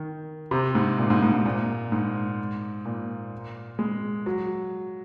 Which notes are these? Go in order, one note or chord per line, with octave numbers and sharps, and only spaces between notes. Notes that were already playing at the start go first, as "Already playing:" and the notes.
Already playing: D#3
C3
G#2
A#2
G#2
G#2
G#2
A#2
G#2
A#2
G#3
F#3